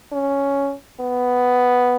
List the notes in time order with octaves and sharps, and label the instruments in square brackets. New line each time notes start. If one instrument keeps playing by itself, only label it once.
[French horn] C#4
B3